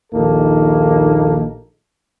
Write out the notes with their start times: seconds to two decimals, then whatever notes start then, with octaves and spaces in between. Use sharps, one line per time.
0.13 A#1 D#2 A#3 D#4 A4